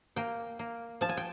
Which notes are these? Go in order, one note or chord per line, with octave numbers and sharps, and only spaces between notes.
A#3 G5
A#3
F3 A5
G#5
G5